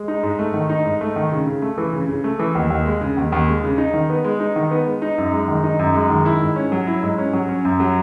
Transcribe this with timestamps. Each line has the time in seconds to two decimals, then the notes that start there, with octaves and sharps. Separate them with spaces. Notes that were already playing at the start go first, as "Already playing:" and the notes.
Already playing: G#3
0.08 D#4
0.23 G#2
0.39 A3
0.54 D#3
0.69 D#4
0.85 G#2
1.01 A3
1.16 D#3
1.32 C#3
1.47 C#3
1.62 A3
1.78 E3
1.93 C#3
2.09 C#3
2.24 A3
2.39 E3
2.55 D#2
2.70 D#2
2.86 G#3
3.01 C#3
3.17 D#2
3.32 D#2
3.48 G#3
3.64 C#3
3.78 D#4
3.94 D#3
4.10 B3
4.24 G#3
4.40 D#4
4.56 D#3
4.71 B3
4.86 G#3
5.02 D#4
5.18 F#2
5.33 G#3
5.48 D#3
5.63 D#4
5.79 F#2
5.95 G#3
6.10 D#3
6.26 E4
6.41 G#2
6.56 C#4
6.72 F#3
6.87 E4
7.03 G#2
7.18 C#4
7.33 F#3
7.49 C#4
7.65 F#2
7.80 F#3